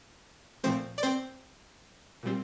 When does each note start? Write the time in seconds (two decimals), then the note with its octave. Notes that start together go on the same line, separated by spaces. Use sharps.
0.64 A#2 F3 A3 C4 C5
0.98 D5
1.03 C4 C5
2.23 A#2 G3 C4